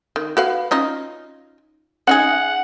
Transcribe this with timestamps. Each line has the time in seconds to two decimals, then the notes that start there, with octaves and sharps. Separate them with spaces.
0.16 D#3
0.37 F#4 B4 F5
0.71 C#4 D#4 F4
2.07 C#4 D#4 G#4 F#5